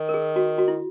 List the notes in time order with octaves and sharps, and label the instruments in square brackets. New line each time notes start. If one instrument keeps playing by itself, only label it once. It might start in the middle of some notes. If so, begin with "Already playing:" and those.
Already playing: [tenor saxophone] D#3
[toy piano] A#4
G#4
F#4
F#4
E4